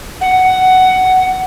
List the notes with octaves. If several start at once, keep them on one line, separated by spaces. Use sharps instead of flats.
F#5